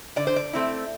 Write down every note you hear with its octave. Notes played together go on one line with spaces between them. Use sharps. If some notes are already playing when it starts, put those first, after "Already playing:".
D3 D5
C5
D5
A3 C4 E4